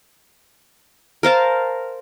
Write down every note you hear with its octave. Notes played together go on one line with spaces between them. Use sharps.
A#4 C5 F5 A5